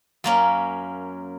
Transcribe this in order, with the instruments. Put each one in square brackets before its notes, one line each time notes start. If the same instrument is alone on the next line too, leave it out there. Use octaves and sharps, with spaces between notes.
[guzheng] F#2 A#3 C#4